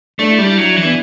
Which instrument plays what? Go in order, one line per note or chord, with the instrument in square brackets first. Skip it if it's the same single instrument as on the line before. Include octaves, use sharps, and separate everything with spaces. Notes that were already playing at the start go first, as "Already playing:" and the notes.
[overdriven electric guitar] A3 [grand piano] D4
[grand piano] E4
[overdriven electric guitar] G3 [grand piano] D4
[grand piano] E4
[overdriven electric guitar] F#3 [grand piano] D4
[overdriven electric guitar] E3 [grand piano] E4
[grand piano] B3 D4